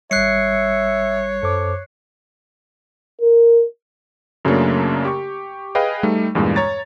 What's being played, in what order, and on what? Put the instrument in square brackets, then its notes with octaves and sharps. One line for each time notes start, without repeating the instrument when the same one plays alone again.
[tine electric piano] G#1 G3 [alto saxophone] C#5 [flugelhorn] E5 [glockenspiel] F#6 C7 C#7
[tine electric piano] F#2 C5 D6 [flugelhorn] A4
[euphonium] A#4
[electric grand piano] F#2 C#3 F#3 A3 A#3 D4
G4 C#6
G#4 B4 D#5 F5 G5
G3 A3 D#4
E2 G2 A#2 G#3
C#5 A#5 A6